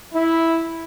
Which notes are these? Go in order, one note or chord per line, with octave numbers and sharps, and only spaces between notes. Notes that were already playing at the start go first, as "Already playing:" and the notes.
E4